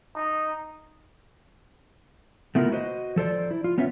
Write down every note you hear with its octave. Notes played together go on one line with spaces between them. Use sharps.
D#4
A3 B3 E4 F4 G#4 A#4
F#4 B4 C5 D#5
F3 A4 C5 D5
E4
F4
B3 C#4 F4 B4 E5